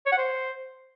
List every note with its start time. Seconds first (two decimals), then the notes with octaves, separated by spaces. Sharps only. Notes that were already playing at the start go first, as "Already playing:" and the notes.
0.06 C#5
0.12 F#5
0.18 C5